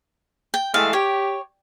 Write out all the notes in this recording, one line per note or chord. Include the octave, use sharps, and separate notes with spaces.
G5
E3 G#3 A3 F5
G4 C#5